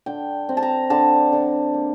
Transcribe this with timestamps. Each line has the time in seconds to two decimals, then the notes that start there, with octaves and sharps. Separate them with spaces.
0.06 D3 G5
0.49 C4
0.57 A5
0.63 A#5
0.90 D3 A5
1.33 D3
1.74 A#3